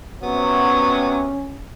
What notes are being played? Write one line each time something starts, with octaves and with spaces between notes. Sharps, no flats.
C3 F#3 B3 C#4